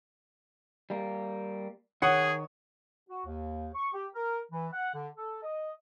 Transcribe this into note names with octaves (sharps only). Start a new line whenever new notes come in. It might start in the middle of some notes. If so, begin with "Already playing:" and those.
G3 A#3
D#3 G#4 C#5 F#5 D#6
F#4
D#2
C#6
G4
A#4
E3
F#5
D3
A4
D#5